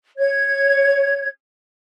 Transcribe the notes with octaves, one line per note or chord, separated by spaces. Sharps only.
C#5 G#6